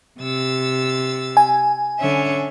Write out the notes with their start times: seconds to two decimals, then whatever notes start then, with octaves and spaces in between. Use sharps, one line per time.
0.20 C3 E6 A6
1.37 G#5
2.00 D3 C#4 E5